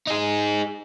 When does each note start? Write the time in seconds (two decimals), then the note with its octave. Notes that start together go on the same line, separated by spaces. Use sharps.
0.07 D#4 G#4